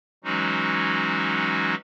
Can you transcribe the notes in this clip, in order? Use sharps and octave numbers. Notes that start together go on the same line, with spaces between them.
E3 F#3 G#3 C#4 D#4 F#4